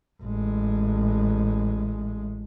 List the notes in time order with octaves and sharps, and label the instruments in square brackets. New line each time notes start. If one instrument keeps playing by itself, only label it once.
[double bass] A1 G#3